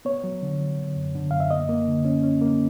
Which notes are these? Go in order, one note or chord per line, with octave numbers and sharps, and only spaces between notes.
B3 C#5
F#3
D3
F#3
D3
F#2
D3
F#2 F5
E5
A#3 D#5
A#3
D3
C#4
C#4
A#3